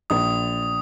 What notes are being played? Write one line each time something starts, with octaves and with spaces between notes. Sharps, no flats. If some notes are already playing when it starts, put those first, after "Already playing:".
A#1 D#6